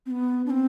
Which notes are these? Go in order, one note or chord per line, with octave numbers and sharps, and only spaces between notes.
C4
B3
D4
C4